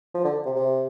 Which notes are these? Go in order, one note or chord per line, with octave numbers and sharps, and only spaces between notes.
F3
D3
C3
C3